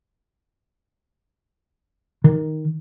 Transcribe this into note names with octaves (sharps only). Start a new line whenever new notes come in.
D#3